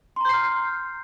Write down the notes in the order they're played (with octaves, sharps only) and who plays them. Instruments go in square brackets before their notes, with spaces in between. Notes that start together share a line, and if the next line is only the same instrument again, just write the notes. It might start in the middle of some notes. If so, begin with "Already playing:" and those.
[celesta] C6
A#5
G6
C7
F6